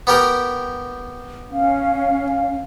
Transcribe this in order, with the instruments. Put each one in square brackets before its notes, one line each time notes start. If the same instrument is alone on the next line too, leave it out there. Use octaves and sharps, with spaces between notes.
[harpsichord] B3 G4 A#4
[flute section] C#4 F5